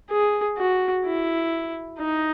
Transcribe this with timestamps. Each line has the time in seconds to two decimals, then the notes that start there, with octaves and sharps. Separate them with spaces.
0.10 G#4
0.57 F#4
1.06 E4
1.99 D#4